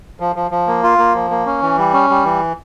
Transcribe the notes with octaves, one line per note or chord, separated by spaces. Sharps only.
F3
F3
F3
A#3
F4
A#3
F3
A#3
C#4
E3
G3
C#4
G3
E3